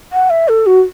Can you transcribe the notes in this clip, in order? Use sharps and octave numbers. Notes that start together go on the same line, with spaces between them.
F#5
E5
A4
F#4